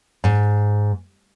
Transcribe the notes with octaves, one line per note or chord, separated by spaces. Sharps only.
G#2